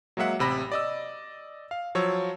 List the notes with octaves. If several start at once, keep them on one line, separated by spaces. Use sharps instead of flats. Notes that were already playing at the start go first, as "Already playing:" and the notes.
F#3 G#3 A#3 E5 F#5
A1 C3 B5 A#6
D5 D#5 E6
F5
F3 F#3 C#5 E6